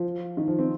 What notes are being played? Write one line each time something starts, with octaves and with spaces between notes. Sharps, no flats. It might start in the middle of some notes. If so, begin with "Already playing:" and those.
Already playing: F3
D#3
F3
C4